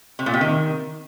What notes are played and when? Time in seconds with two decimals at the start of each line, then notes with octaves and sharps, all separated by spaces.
0.19 C3
0.26 A#2
0.34 C3
0.41 D#3